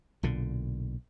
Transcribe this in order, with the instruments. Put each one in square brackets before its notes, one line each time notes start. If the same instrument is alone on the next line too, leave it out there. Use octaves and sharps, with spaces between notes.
[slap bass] B1 A#2 D3